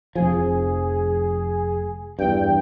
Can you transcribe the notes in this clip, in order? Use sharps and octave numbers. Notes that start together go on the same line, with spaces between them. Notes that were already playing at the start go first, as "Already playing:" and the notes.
F1 F3 G#4
E2 G2 G5